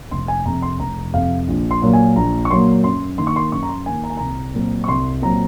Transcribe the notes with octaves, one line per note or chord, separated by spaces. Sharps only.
F1 C6
G#5
F2 C3 A#5
C6
F1 A#5
F2 C3 F5
A#1
C6
A#2 F#3 A#3
G#5
A#1 A#5
C#6
A#2 F#3 A#3 C6
F#2 C6
D#3 A#3 C6
C#6
C6
F#2 C#6
A#5
C6
D#3 A#3 G#5
A#5
G#5
C2 A#5
A#2 F#3 C4
C#6
C2 C6
A#2 F#3 C4 A#5